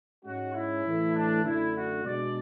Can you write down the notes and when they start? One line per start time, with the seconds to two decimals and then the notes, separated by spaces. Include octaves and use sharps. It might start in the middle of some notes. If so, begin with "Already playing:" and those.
0.24 G#2 G#3 C#4 F#4
0.53 E4
0.85 A2 E3 A3
1.14 D4
1.44 F#2 D3 A3 D4 E4
1.75 F#4
2.04 B2 G#3 D4 D5